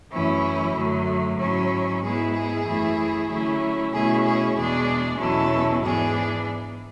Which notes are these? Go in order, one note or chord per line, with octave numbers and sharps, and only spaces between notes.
F#2 E3 A3 C#4 E4
F#2 D3 F#3 A3
G#2 F#3 C#4 E4
G#2 G#3 B3 E4 G#4
G#4
F#2 E3 A3 E4
D3 F#3 A3 C#4 E4
B2 A3 C#4 E4 G#4
G#4
E2 B2 G#3 D4 G#4
E2 B2 F#3 C#4 E4 A4
G#2 E3 B3 D4 G#4